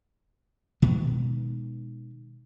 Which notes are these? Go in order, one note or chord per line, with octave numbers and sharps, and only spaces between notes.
B2 D#3 G#3 B3